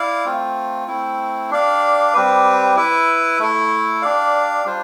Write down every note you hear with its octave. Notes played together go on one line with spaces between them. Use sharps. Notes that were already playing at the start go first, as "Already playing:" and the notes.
Already playing: E4 D5 F5
A3 C4 F4
A3 C4 E4
D4 G4 D5 F5
G3 C4 G4 B4
E4 B4 E5
A3 E4 A4
D4 G4 D5 F5
G3 D4 F4 C5